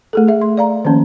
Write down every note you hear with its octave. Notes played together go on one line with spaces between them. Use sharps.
A3 G#4 A4
G#4 E5
C6
D5 F5 A#5
D#3 F3 A#3 C#4